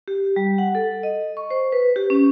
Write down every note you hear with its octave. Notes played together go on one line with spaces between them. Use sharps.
G4
G3
F#5
A4
D#5
C#6
C5
B4
G4
C#4